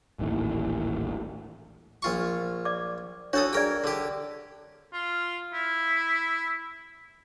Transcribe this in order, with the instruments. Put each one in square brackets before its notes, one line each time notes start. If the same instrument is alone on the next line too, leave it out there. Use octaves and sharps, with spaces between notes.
[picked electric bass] D#1 A1 D#2 A2
[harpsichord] A#1 F4 C#6
[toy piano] D5 D6
[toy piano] D4 C#5 [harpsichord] F#4 A4 D#6
[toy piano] G#4 D5 [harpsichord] A#4 G5
[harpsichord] D3 G4
[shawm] F4
E4